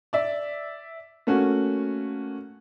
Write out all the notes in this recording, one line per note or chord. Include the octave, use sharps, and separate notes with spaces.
D5 E5
A3 A#3 C#4 F#4